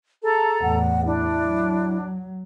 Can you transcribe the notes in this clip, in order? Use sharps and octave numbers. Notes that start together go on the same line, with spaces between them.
G#4 A4 A#5
E2 A2 F#5
D4 E4
F#3